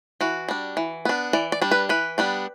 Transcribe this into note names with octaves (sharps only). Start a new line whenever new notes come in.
E3 F#4
G3 D4
E3
B3 D4
E3 D5
D5
G3 D4
B4
E3 B4
G3 B3 D4